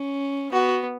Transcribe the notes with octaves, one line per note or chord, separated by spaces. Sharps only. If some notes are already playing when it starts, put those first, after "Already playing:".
Already playing: C#4
B3 F#4